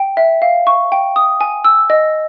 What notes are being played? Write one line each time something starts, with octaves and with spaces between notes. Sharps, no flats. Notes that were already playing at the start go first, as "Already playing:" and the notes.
Already playing: G5
E5
F5
C#6
G5
D#6
G#5
E6
D#5